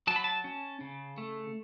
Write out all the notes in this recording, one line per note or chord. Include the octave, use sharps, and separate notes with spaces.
F#3 A5
B5
A5
C#4
C#3
A3